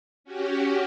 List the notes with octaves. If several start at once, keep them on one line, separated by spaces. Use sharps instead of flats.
C#4 F#4 G4